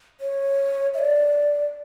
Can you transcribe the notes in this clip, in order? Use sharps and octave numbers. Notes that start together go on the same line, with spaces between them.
C#5
E5
D5